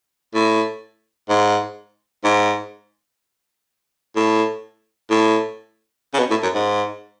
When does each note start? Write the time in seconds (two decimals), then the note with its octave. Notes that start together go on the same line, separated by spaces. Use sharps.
0.34 A2
1.29 G#2
2.24 G#2
4.16 A2
5.10 A2
6.14 C#3
6.19 B2
6.30 A2
6.43 F#2
6.54 G#2